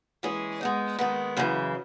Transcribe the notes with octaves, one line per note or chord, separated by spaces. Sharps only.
E3 G#3 C#4 G#4
G#3 B3 D#4
D#3 G#3 B3
F#2 C#3 E3